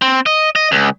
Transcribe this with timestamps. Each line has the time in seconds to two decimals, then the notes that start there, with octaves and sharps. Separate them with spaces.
0.02 C4
0.26 D#5
0.55 D#5
0.72 C#2